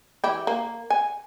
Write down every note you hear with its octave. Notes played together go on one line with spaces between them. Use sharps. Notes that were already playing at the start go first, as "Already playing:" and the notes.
E3 E4 G4
A#3
G#5